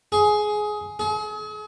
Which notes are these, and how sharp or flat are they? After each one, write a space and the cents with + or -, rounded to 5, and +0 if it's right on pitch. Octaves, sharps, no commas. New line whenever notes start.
G#4 +15
G#4 +40